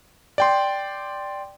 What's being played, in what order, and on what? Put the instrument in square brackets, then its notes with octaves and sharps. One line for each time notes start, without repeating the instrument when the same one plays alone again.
[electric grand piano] D5 G5 C6